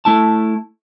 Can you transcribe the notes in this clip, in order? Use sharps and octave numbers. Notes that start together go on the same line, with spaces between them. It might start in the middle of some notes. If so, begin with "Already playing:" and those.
A3 E4 A5